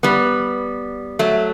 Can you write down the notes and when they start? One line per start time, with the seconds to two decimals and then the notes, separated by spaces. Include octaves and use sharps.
0.03 G3 B3
1.19 F#3 A3